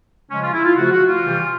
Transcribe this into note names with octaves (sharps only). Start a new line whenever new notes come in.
C#3 F3 G#3 C#4
F4
E4
F4
C#3 F3 A3 F#4
F#4
F4
C3 E3 G3